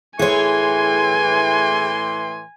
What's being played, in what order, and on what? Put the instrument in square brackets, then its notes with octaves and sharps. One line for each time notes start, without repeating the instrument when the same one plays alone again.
[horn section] A2 E3 C6 [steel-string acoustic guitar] G#4 C#5 [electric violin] G#5